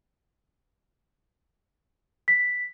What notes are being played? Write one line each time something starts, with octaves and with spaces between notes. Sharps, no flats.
B6